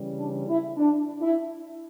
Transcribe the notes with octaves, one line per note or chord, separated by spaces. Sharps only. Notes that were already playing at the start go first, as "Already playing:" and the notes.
Already playing: C#3 E3 G3
D4
E4
D4
E4